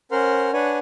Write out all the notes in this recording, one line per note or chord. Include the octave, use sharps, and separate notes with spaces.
C#4 A#4 C5 F#5 C6 F6
D4 B4 C#5 F#5 G#5